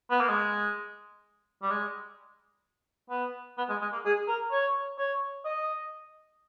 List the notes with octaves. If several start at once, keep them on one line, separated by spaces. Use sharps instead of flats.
B3
A#3
G#3
G3
G#3
B3
B3
G#3
G#3
A#3
G#4
A#4
C#5
C#5
D#5